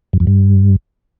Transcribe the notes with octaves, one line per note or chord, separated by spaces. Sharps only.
F#2
F2
G2